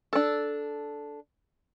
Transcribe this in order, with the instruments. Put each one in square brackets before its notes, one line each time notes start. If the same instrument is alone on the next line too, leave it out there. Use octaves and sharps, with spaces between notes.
[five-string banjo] D4 A4